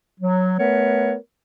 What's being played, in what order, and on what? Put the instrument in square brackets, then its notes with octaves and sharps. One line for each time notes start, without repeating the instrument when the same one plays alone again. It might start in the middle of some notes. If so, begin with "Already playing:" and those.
[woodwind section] F#3
A3 B3 A#4 B4 C#5